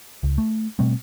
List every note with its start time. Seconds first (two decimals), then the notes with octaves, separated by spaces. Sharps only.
0.23 C#2
0.38 A3
0.79 B2 G3 A3 C4